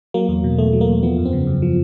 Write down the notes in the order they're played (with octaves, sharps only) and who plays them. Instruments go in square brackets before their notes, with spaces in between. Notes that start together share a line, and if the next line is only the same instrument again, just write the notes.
[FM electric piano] F#3 A#3
E2
B2
E2 A3
F#3
A#3
E2
F3 B3
F#2
C4
C#3
F#2
F3